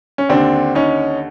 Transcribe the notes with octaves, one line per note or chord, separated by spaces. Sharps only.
C#4
D#2 D3 C4 D4
C#4 D#4